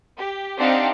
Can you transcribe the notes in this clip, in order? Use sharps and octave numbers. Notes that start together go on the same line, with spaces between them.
G4
C4 D4 D#4 G4 F5 F#5